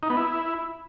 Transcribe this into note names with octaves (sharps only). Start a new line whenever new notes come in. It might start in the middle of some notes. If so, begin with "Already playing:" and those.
D#4
B3
E4